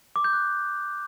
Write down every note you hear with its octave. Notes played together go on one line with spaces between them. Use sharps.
D6
G6
F#6